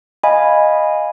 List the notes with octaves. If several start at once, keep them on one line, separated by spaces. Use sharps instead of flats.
D#5 F5 G#5 B5